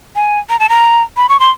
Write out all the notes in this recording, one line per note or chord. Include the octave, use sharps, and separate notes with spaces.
G#5
A#5
A5
A#5
B5
C#6
C6